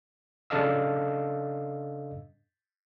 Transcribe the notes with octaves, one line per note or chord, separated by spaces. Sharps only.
C#3 D4 A4 D#5 F5 E6